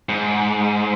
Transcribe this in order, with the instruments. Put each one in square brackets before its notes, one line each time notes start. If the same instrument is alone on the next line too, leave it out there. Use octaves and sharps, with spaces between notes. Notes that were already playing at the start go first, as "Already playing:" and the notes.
[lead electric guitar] G#2